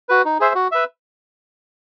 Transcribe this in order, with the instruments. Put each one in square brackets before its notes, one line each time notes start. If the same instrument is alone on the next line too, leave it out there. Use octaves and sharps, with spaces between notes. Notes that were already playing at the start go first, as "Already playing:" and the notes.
[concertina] F#4 B4
D#4
G#4 C5 E5
F#4
B4 E5